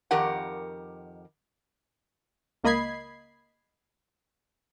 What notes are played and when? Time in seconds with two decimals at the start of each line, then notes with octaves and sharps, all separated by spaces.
0.11 F2 D#3 G4 A#4 F#5
2.64 C#2 A#3 D#5 B5 G#6 C7